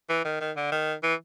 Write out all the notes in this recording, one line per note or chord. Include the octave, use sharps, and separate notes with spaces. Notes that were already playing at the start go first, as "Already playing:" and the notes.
E3
D#3
D#3
D3
D#3
E3